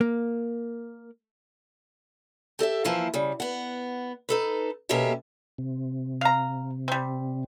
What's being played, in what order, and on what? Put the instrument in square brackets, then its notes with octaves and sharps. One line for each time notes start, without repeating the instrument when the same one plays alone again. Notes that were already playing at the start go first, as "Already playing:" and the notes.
[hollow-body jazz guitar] A#3
[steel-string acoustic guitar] G4 A4 D#5 E5
E3 F3 A#3 E4 C5
C#3 G3
B3 F#5
D#4 A4 B4
B2 A#3 C#4 G4 A4 E5
[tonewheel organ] C3
[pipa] F5 A#5
G3 C4